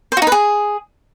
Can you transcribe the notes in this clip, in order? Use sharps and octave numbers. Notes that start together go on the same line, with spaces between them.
C5
F#4
D#4
B4
G#4